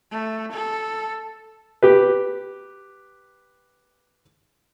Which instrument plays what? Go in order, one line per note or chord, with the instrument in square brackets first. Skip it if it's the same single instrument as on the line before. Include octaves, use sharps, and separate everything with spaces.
[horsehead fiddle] A3
A4
[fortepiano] G4 B4